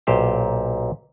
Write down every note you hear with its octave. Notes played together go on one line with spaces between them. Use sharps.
B1 A#2 G4 C5 F5